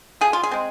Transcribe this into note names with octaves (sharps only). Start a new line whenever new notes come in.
F3 G#4
F4
G#4
G#3 C4